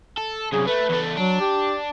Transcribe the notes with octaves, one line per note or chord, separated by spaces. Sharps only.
A4
C2 F#2 G#4
A3 B4
E2 A3
F#3 D4
G4